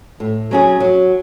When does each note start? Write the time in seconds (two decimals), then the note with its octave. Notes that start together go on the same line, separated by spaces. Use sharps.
0.20 A2
0.51 F#3 C#4 G#4
0.80 F#3